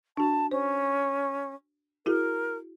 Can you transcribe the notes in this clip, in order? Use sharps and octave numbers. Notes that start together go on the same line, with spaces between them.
D4 F#4 A5
C#4 C5
E4 F#4 G#4 A#4